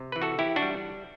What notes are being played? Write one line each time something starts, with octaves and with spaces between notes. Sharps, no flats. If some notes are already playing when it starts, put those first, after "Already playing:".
Already playing: C3
E3 B4
F#4 A4
E3 E4 G4
D4 F#4
G3